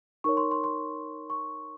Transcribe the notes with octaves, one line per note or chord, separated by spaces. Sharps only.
D#4 A#4 C#5 C#6
C6
C6
C6
C#6